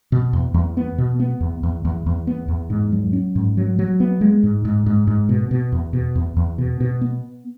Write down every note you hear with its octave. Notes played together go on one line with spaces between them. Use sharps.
B2
E2
E2
B3
B2
B3
E2
E2
E2
E2
B3
E2
G#2
F#3
C#4
G#2
F#3
F#3
B3
G#3
G#2
G#2
G#2
G#2
B2
B2
E2
B2
E2
E2
B2
B2
B3